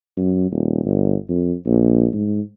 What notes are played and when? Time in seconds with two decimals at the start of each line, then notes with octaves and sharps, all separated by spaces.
0.17 F#2
0.52 D#1
0.85 G1
1.29 F2
1.66 A#1
2.13 G#2